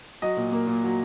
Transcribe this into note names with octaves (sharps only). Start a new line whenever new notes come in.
F#3 D#5
A#2
A#3
A#2
F#3